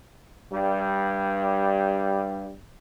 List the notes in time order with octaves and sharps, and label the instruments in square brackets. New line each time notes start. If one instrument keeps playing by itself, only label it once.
[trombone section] G2 G3